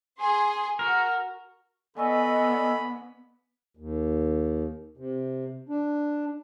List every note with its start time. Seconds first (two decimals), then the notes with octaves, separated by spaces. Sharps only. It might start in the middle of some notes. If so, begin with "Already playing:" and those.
0.19 G#4 G#5 C6
0.79 F#4 A#4
1.97 B3 A4 D5 D#5 G#5 B5 C#6 E6
3.77 D#2
4.97 C3
5.69 D4